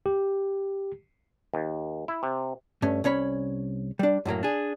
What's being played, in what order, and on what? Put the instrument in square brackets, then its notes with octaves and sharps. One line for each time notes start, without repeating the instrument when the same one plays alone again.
[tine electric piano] G4
[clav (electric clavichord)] D#2
E4
C3
[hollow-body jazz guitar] G2 A3 C#4
C2 C#4 C#5 B5
G3 D4
F#2 A2 F#3 A#3
D4 G#4